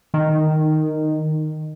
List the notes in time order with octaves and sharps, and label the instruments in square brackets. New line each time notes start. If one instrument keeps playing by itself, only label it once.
[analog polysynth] D#3